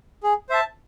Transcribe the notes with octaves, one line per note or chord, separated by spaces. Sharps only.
G#4
C5 E5 A5